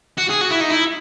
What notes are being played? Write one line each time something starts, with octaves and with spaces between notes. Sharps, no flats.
F#4
G#4
F#4
E4
D#4
E4